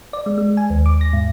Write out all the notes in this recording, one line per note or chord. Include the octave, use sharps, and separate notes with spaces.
D5
G#3
G#3
G#5
D#2
D6
A#6
G#2